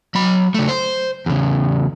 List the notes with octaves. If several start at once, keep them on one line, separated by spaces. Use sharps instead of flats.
F#3 B5
C#3 A3
C5
E2 C#3